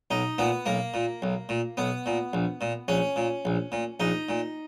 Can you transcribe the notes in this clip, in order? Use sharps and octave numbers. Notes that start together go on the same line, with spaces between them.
B1 D#4
A#2 B3
B1 A#3
A#2
B1
A#2
B1 B3
A#2
A#1
A#2
A#1 C#4
A#2
A#1
A#2
A#1 D#4
A#2